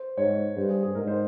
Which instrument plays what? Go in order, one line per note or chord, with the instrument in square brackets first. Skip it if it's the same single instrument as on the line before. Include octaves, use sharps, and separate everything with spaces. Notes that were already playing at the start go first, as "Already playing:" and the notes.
Already playing: [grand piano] C5
[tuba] G#2 [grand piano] C#5
[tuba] G2 [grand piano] C5
[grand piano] G#4
G#4
[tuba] G#2 [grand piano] A#4
[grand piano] C5